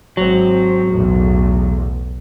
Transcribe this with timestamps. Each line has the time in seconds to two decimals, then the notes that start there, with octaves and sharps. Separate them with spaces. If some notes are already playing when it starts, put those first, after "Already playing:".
0.17 G#1 F#3 C4
0.89 B1 E2 A2